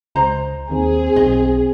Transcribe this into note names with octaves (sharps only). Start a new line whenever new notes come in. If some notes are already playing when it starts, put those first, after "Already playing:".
C#2 C5 D#5 A#5
D#2 C4 G#4
B1 D#5